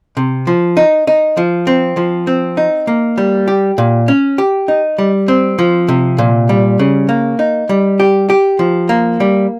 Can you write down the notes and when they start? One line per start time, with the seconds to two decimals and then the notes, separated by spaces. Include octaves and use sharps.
0.17 C3
0.47 F3
0.77 D#4
1.07 D#4
1.37 F3
1.67 C4
1.97 F3
2.27 C4
2.57 D#4
2.87 A#3
3.18 G3
3.48 G4
3.78 A#2
4.08 C#4
4.38 G4
4.68 D#4
4.98 G3
5.28 C4
5.59 F3
5.88 C3
6.18 A#2
6.49 G3
6.79 C#3
7.09 A#3
7.39 D#4
7.69 G3
8.00 G4
8.30 G4
8.59 F3
8.89 A#3
9.20 G3